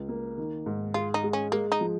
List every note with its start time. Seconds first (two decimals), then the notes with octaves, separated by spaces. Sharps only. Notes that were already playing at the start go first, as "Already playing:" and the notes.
Already playing: C#2
0.09 A#3
0.38 D#3
0.66 G#2
0.94 F4 G#4
1.14 D#4
1.23 G#3
1.33 C#4
1.52 G#3 A#3
1.72 D#4
1.81 F3